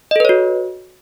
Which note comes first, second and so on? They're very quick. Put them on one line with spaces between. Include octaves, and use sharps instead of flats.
D#5 A4 B4 C#5 F#4